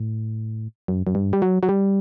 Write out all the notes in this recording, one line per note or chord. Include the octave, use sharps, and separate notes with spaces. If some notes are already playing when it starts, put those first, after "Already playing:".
Already playing: A2
F#2
F#2
G2
G3
F#3
F#3
G3